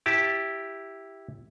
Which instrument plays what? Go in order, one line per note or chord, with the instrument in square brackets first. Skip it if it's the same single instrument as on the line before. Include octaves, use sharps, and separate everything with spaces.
[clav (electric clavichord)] E4 G4 A5